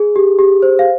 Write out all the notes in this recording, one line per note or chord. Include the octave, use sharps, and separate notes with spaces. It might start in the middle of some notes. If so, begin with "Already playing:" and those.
Already playing: G#4
G4
G4
C5
F5